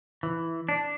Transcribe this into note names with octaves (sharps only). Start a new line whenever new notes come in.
E3
D4